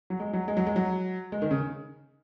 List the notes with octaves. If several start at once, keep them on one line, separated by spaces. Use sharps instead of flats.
F#3
G#3
F#3
G#3
F#3
G#3
F#3
G#3
D#3
C#3